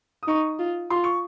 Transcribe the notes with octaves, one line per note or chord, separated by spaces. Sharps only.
D#6
D#4 C#6
F4
F4 C6
C#6